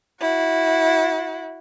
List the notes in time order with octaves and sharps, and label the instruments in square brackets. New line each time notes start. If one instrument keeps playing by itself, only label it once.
[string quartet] E4 F#4